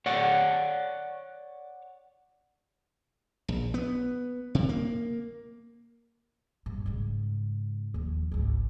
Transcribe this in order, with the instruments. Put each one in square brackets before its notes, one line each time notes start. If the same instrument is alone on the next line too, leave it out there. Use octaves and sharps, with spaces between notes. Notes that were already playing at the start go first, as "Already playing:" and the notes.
[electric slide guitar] C#5 D5 F#5
[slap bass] A#1
B3
C3
A#3
[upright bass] G2 A#2
G#2 C#3
D#2 F3
G#1 C#2